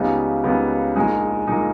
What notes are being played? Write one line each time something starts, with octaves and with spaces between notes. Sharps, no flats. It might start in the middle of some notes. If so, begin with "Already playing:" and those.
Already playing: C#2 C#3 G3 B3 D#4
C#2 C#3 G3 B3 D#4
A#1 A#2 G#3 D#4
A#2 G#3 D#4